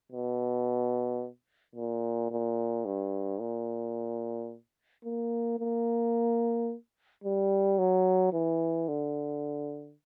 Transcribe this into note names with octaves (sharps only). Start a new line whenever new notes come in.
B2
A#2
A#2
G2
A#2
A#3
A#3
G3
F#3
E3
D3